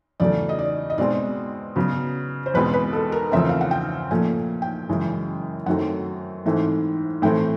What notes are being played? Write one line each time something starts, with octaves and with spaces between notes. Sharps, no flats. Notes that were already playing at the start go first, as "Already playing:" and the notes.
E2 C#3 F#3 A3 D5
D#5
D5
D#5
B2 G#3 C4 D5
C#3 F#3 B3
C5
E2 B2 G#3 C4 B4
B4
A4
A#4
E2 C#3 F3 A3 C4 E5
F5
F#5
G5
A#2 F3 A3 G#5
G5
F#2 C#3 E3 G#3
F#2 D#3 F#3 A3 C4 F#5
G#2 E3 A3 C4
A2 E3 A3 C4 G5